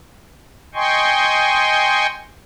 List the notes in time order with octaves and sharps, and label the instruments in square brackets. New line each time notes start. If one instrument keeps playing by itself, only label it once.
[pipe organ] D#5 G5 G#5 C6 C#6